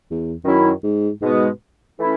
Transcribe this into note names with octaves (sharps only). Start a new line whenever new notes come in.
E2
F#2 D#3 F#3 C#4 E4
G#2
G#2 B2 G#3 B3
E3 A3 C#4 E4